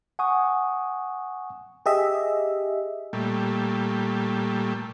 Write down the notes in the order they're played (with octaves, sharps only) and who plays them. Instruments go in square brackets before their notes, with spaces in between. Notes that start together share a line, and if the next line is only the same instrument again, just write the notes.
[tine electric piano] F#5 G#5 C#6 D#6
[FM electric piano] G4 G#4 D#5 E5
[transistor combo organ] A#2 G3 A3